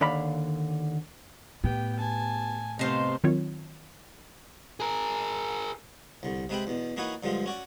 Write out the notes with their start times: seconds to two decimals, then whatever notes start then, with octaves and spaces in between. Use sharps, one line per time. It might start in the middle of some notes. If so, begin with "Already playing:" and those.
0.01 D#2 D3 D5 F5 B5
1.64 A2 B3 G4 G5
1.97 G#5 A5
2.79 C3 A3 B3 D#4 G4 C5 F5 C6
3.24 D#3 F#3 C4 F4 C#5
4.80 G#4 A#4
6.23 C2 D3
6.49 C3 G#3 B4 E5 G5 B5
6.67 E2 B2
6.97 E3 A#3 D#4 F#4 B4 C#5
7.23 G2 D3 F3 G#3 F4
7.46 C#4 F#4 D5